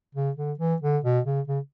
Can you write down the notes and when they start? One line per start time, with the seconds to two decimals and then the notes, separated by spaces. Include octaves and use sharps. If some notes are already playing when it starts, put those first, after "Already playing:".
0.15 C#3
0.37 D3
0.59 E3
0.82 D3
1.04 B2
1.25 C#3
1.48 C#3